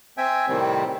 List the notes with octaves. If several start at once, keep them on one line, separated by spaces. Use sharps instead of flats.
C4 E5 G5 G#5
A2 C3 D#3 G3 C4